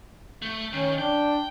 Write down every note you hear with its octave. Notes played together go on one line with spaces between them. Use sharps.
A3
D#3 C#4
D4 G5